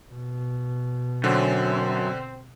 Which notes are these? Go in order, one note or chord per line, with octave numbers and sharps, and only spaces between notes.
B2
F#2 D3 C4